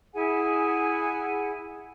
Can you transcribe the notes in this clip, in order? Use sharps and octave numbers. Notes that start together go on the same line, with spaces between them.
E4 G#4 F#5 G#5